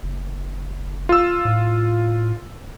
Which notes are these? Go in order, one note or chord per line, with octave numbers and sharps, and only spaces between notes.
F#1
F4 E6
A2